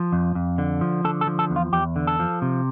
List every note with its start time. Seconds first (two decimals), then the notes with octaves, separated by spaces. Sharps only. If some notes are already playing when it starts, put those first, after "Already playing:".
Already playing: F3
0.12 F2
0.35 F2
0.58 D3
0.81 F3
1.04 D3 A4
1.21 A4
1.27 F3
1.39 A4
1.50 E2
1.56 F4
1.72 E2 G4
1.96 D3
2.07 A4
2.19 F3
2.42 C3